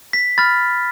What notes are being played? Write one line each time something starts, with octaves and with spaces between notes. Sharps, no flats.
B6
B5 F6 A6